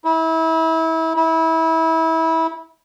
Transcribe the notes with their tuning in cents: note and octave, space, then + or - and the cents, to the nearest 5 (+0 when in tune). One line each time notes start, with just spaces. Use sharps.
E4 -30
E4 -25